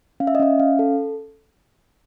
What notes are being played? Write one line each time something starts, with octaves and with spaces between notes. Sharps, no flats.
C#4 F5
E5
D#5
C#4 E5
C#4 F5
A4